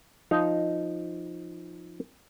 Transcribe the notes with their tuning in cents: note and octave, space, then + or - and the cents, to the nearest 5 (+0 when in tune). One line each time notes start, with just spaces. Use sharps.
F3 +0 D#4 +0 F5 -5